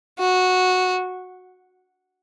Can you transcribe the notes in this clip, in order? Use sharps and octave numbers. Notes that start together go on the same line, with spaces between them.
F#4